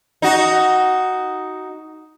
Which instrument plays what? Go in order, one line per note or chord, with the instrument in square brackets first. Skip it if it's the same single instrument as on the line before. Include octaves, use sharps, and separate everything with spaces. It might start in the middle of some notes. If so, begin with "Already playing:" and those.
[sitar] D#4 F#4